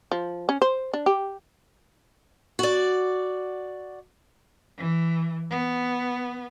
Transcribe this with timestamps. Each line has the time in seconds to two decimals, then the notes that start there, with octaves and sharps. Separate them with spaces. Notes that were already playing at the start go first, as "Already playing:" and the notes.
0.12 F3
0.49 C#4
0.62 C5
0.94 D4
1.06 G4
2.59 F#4 D5
4.78 E3
5.51 B3